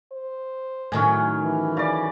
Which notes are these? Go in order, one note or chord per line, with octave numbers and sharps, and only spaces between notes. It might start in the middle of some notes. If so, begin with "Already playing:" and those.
C5
A2 D#3 F#3 C#4 G#5
E3
C#3 D5